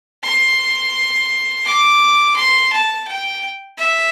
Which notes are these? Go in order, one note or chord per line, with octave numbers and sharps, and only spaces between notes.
C6
D6
C6
A5
G5
E5